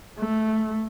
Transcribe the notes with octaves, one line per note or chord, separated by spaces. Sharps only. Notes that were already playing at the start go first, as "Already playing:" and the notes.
A3